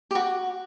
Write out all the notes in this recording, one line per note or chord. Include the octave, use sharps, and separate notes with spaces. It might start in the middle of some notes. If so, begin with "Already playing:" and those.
G4
F#4